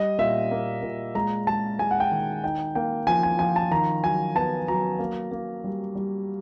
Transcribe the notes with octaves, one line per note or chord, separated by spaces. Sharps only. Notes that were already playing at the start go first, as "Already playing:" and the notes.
Already playing: G3 D#5
A#2 E5
A#3
A#2
G#3 A#5
G#3 A5
G#3 G#5
F#5
G5
D#3
D#4 G5
A#3 G5
F3 G#5
G#5
F3 G#5
A5
D#3 A#5
F#3 G#5
B3 A5
F#3 A#5
A#3
A#3
G3
G3